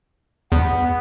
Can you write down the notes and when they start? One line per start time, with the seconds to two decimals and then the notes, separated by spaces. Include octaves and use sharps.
0.52 E2 B3